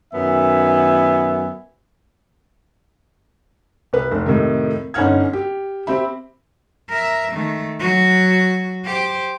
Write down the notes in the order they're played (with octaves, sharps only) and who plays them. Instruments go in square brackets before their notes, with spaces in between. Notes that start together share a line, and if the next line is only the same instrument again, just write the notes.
[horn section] F#2 D#3 B3 E5 G#5
[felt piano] C2 B4
F1
F2 A2 C3 D#3
G1 C#4 D#4 F#5 F6 G#6
G4
C4 G4 E5 B5
[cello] A#4 E5
D#3 A3
F#3 F#4
G4 C5